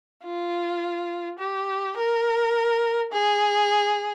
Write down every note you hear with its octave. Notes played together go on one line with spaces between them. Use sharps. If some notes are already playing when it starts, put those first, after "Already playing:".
F4
G4
A#4
G#4